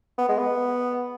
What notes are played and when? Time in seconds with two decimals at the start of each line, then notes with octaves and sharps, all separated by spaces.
0.18 B3
0.29 G#3
0.39 B3